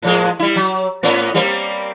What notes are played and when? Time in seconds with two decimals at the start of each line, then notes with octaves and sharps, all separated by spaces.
0.02 A2 F3 G#3
0.40 G3 E4
0.56 F#3
1.03 A2 B3 C#4
1.34 G3 A#3 C4